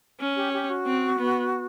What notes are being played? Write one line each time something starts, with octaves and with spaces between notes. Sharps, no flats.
C#4
G4
G4
F#4
C4
B3